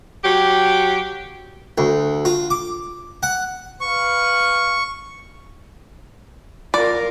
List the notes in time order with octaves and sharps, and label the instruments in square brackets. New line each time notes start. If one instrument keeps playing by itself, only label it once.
[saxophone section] F#3 G4
[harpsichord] D2
F4
D6
F#5
[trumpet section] B4 F5 [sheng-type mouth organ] C#6
[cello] F4 A#4 [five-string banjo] D5